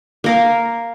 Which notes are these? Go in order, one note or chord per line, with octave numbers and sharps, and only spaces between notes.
A#3 A#4 F5